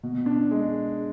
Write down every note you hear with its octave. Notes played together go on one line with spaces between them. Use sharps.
B2
D4
G#3